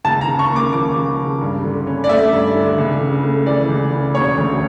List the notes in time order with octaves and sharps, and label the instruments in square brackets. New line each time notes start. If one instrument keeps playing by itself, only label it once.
[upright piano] C#2 A5
A#5
C#3
C#6
A#3
D6
F3 D6
C#2
C#3
G2
D3
C#4
D5
A3 E5
G2
D3
C#2
C#3
A3
E3 D5
C#2
C#3
E1 C#5
D2